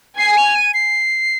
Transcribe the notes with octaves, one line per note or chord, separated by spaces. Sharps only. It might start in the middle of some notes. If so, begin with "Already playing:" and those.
G#5 C7
F7
D#7
C7